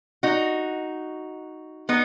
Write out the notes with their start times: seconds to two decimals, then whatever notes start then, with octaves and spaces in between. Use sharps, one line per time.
0.23 D#4 F#4
1.89 B3 D#4